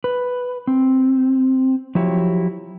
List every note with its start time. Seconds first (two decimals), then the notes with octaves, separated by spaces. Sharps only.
0.04 B4
0.67 C4
1.95 F3 F#3 E4 G4 C#5